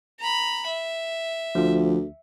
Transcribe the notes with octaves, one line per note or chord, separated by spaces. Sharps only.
A#5 B5
E5
D2 F3 F4